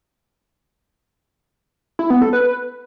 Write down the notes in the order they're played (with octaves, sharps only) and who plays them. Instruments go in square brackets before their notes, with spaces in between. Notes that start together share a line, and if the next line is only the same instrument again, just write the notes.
[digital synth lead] E4
B3
A4
B4